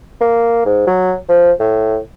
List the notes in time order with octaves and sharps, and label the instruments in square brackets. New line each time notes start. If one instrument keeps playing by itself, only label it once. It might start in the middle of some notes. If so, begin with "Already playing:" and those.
[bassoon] A#3
G#2
F#3
F3
A2